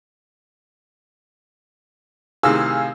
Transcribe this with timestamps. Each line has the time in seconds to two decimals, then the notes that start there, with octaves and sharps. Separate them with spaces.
2.43 A2 C3 D#3 G#4 F5 E6